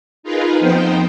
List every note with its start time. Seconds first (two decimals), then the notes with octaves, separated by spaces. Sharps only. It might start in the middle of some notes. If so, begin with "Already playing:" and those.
0.23 D#4 F4 G#4 A#4 B4
0.60 F2 F3 B3 D#4 C5 G5